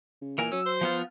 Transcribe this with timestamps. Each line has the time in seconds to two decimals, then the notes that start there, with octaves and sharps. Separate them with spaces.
0.21 C#3
0.38 A#2 E3 A#4 G#5
0.52 F#3 C#4 E6
0.66 C5
0.81 F3 B3 F4